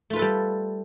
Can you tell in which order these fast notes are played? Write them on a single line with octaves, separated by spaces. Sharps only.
A3 F4 B4 A4 G3